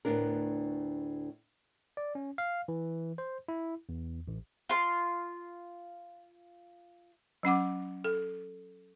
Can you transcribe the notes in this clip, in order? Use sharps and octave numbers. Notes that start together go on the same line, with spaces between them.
D2 A2 B3 D4 A#4
D5
C#4
F5
E3
C5
E4
E2
A1
F4 C6
F#3 C#4 F#5 D6
A4